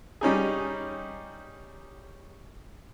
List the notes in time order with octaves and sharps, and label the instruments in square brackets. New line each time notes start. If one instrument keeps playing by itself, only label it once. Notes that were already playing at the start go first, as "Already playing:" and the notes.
[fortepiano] G3 C#4 D#4 G#4